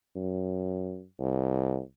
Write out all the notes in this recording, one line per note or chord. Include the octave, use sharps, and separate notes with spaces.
F#2
C2